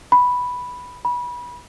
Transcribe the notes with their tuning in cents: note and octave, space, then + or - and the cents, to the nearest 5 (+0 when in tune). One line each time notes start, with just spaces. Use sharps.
B5 +0
B5 -20